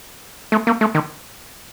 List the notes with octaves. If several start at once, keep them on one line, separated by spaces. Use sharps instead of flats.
A3
A#3
A3
D#3